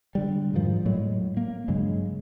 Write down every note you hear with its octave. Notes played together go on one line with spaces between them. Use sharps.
D3 G3
F2 G#2 D#3 F3
A2 F#3 G#3
A#3
G2 C#3 F#3 G#3